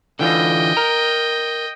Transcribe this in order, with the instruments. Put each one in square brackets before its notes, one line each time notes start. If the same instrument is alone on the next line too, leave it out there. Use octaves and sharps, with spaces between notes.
[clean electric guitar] D3 E3 F4 [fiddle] D#5 G5
[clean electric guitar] A#4 A#5